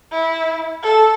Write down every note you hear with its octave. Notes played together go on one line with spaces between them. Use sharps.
E4
A4